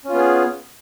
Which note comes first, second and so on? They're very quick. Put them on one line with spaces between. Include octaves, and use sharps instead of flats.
C#4 F4 B3 G#4